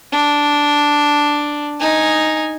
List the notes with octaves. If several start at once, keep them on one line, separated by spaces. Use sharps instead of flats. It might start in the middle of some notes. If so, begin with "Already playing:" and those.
D4
D#4 G#5